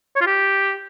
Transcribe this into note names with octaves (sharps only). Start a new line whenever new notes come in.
C#5
F4
G4